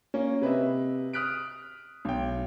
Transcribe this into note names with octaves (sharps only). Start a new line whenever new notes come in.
A#3 C#4
C3 B4 D#5 E5
D#6 F6 F#6 B6 D7
B1 G5